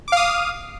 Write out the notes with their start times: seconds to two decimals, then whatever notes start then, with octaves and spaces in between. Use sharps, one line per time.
0.08 D6
0.12 F5
0.17 D#6